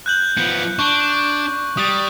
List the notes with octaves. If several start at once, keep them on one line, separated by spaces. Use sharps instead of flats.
F#6 G6 F#7
F3 B3
D4 C#6
G3 D#6 A6